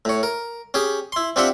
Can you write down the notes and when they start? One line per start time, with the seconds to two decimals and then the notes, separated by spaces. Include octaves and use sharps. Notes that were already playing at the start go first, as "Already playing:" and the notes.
0.05 A2 C#5
0.23 A#4
0.74 C#4 G4 G#4
1.12 E4 C6
1.36 C4 D4 F4 G4 E5 F#5